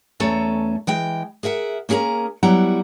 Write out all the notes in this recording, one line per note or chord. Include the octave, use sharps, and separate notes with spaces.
E2 A3 C#4 A4 A#5
E3 G#3 G5
G#4 A#4 E5 F#5
A#3 C#4 G#4 A#4 A#5
F#3 G3 B3 E4 F#5 A#5